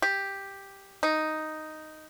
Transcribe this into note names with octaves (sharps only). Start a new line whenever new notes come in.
G4
D#4